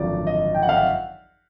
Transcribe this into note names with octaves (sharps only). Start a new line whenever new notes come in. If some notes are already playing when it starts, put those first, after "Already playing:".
Already playing: G#1 F#2 D3 F3 D5
D#5
G5
F#5
F5
E5